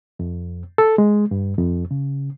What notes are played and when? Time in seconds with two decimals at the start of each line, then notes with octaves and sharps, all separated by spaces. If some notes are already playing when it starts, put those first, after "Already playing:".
0.19 F2
0.78 A4
0.98 G#3
1.31 G2
1.58 F2
1.91 C#3